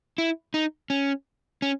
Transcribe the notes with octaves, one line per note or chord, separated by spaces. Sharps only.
E4
D#4
C#4
C#4